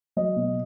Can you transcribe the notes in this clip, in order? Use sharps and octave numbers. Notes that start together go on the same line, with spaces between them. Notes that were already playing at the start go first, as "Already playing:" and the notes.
F#3 D#5
B2